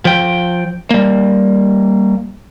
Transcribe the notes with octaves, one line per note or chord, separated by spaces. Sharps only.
F3 G5
G3 A#3